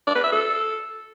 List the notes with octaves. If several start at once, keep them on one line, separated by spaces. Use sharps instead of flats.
D5
B4
E5
A4